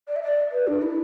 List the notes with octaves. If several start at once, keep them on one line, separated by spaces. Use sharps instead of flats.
D5
E5
D5
B4
D4
E4